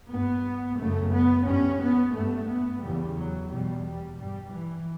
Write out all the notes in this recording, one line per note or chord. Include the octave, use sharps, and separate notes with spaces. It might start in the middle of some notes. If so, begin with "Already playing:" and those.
G2 B3
F#2 C#3 A3
B3
G2 C#4
B3
G2 A3
B3
E2 C#3 G3
F#3
E2 B2 G3
G3
G2 G3
E3